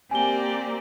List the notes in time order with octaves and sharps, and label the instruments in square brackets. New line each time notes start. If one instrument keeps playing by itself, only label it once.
[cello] A#3 C4 [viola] G4 D5 [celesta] G#5 G7